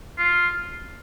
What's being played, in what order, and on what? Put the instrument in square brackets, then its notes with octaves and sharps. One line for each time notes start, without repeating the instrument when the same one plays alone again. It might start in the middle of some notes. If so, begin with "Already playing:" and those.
[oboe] F4